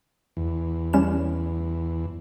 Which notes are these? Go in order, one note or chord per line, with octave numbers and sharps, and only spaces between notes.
E2
G3 C#4 E7